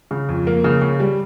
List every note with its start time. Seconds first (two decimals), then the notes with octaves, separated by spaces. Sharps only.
0.11 C#3
0.29 F2
0.47 A#3
0.64 C#3
0.82 C#3
1.00 G3